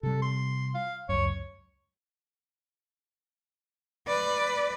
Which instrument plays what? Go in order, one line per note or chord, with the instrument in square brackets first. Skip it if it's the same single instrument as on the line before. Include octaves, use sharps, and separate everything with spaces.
[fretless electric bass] C3 G3 [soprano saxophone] A4
[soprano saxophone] C6
F5
[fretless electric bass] C#2 F#2 [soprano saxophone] C#5
[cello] B4 D5